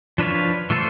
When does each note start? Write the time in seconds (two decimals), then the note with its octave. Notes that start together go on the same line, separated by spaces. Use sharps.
0.18 F3 D4 B4 C#5 F5
0.70 E3 A3 F4 A4 C5